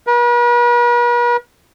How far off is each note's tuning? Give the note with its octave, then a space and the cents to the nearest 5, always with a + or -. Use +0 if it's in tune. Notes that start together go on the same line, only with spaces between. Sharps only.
B4 -45